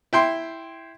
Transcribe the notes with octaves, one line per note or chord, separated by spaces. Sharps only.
E4 G5 C6